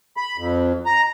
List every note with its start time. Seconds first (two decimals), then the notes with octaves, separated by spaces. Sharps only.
0.17 B5
0.38 F2
0.86 A#5